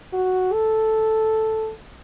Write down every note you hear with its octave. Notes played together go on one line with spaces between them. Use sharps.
F#4
A4